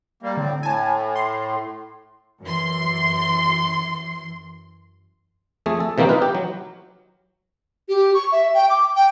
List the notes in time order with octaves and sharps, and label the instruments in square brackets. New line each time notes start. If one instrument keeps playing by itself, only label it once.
[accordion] G3 A#3
[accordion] A2 C4 [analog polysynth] D3
[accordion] A2 [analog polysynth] G#5 A5
[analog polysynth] C6
[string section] F#2 E3 C6
[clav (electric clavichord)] F2 A3 G#4
A4
C3 E3 A#3 C4 D#4
D#4 F4 B4
G4
F#3
[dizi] G4
C#6
E5
G5
D6
G5